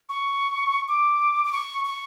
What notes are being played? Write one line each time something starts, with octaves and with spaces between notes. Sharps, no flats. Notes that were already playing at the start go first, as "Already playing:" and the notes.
C#6
D6
D6
C#6
C#6